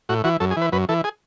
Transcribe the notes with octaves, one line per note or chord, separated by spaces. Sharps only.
A2 F#4
E3 F#4
F#2 A4
G#4
E3 B4
F#2 B4
E3 A4
G#4